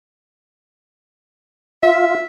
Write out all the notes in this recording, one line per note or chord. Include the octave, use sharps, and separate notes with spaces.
F4 E5